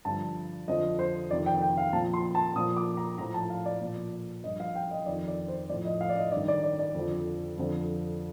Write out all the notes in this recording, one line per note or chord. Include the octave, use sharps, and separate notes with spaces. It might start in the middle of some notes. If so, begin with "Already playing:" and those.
G2 D3 F3 A5
F2 D3 F3 D#5
C5
F2 C3 D#3 D5
G5
G5
F5
A#2 F3 A5
C6
A5
A#2 F3 D#6
D6
A#5
A2 F3 A#5
A5
F5
D5
A#2 F3
G2 F3 D#5
F5
G5
D#5
F2 D#3 D5
D5
C5
A2 F3 D5
D#5
F5
D5
D#5
G2 D#3 D5
D5
D5
D5
F2 D3 F3
F2 D3 F3